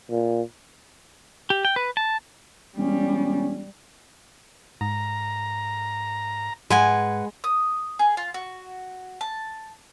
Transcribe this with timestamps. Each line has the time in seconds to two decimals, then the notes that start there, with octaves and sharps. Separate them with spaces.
0.10 A#2
1.50 G4
1.65 G5
1.76 B4
1.97 A5
2.77 E1 G3 C#4
4.81 G#2 A#5
6.70 G#2 G#3 B4 F#5 G#5
7.44 D#6
7.99 G#4
8.17 F4
8.34 F#4
9.21 A5